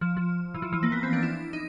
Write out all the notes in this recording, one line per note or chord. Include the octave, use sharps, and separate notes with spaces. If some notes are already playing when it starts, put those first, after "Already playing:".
F3
F3
E3
F3
E3
A#3
B3
C4
D4
E4
D#4